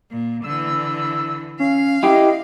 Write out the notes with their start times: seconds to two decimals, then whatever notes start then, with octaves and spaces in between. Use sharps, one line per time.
0.11 A#2
0.44 D3 E3 E6
1.60 C#4 F5
2.03 E4 G4 D#5